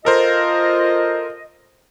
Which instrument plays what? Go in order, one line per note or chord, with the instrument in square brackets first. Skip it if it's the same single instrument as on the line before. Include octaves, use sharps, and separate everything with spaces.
[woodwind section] F4 D#5 [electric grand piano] A4 A#4 C5